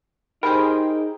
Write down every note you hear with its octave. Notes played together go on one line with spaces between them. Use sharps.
D#4 G4 G#4 A#4 C5 G5 B5 F6